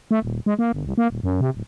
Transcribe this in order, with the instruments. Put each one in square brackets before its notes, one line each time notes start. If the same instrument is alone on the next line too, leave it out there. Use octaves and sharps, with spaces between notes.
[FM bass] A3
D#1
G#3
A#3
G1
C2
A#3
D#1
F#2
C3
D1